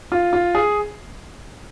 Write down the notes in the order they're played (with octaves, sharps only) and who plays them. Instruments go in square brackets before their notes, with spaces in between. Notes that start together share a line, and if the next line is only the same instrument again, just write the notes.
[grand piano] F4
F4
G#4